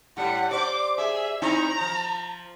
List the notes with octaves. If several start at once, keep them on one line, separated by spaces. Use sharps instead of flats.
A2 G3 F#5
C5 D5 D6
G#4 E5
C4 D#4 E4 A#5
F3